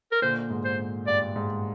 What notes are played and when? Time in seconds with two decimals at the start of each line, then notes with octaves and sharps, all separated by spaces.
0.12 A#4
0.22 A#2 D3 C5
0.50 G#2
0.65 C5
1.07 G2 D5
1.36 G#2